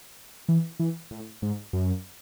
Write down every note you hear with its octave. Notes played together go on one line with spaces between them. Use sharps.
E3
E3
A2
G#2
F#2